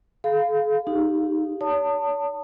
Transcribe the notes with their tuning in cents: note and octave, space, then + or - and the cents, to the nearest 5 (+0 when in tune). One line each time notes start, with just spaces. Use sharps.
G#4 +45 F5 +0 B5 +45
D#4 +0 G4 +0
C#5 +45 A5 +30 D#6 -25